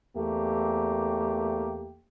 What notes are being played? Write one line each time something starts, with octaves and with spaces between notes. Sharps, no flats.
E2 A3 A#3 G4